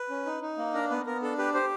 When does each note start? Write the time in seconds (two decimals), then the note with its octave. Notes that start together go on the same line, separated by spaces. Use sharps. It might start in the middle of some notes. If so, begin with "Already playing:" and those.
Already playing: B4
0.10 C#4
0.26 D#4
0.42 D#4
0.58 A#3
0.74 D4 A#4
0.90 B3 B4
1.06 B3 A#4
1.22 D4 A4
1.38 G4 B4
1.54 G4 C5